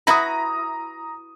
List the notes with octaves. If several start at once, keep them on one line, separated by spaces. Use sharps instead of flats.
E4 F#4 B4 A#5 D#6